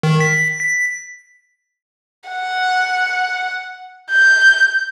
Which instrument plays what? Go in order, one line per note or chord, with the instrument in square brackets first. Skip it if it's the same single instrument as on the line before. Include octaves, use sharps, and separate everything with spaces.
[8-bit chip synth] D#3
B6
B6
[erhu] F#5
G6